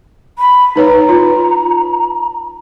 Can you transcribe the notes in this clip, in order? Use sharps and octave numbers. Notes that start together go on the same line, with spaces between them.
B5
D#4 B4 C#5 A#5
F4